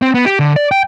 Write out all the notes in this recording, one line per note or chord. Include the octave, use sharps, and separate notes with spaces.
C4
B3
G4
D3
D5
G5